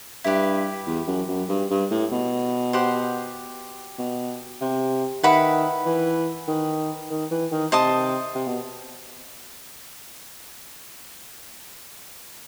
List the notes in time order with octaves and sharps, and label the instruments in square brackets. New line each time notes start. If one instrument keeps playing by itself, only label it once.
[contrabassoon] G2 [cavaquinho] E4 G4 B4
[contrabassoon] E2
F#2
F#2
G2
G2
A2
B2
[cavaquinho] G4 C5 F#5 C6
[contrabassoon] B2
C3
[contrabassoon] D#3 [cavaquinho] E4 B4 F#5 B5
[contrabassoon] E3
D#3
D#3
E3
D#3
[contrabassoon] C3 [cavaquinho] C5 D#5 A5 D#6
[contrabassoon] C3
B2